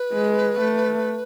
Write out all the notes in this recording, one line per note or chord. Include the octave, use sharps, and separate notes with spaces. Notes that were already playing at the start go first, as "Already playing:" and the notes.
Already playing: B4
G#3
A3